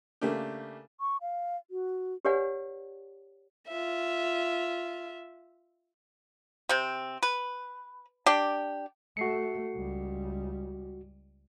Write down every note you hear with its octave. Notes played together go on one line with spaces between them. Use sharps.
C#3 A3 A#3 D4 G4
C#6
F5
F#4
G4 B4 C#5 D5 F#5 G#5
F4 E5
C3 C4
B4
D4 G4
A3 F#4 C7 C#7
C#2 G3